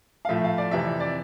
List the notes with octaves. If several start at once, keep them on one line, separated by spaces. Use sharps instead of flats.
F5
A2 F3 A3 E5
F5
D5
F2 C3 E3 E5
D5